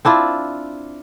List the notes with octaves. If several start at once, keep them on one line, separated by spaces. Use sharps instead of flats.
C4 D4 E4 F4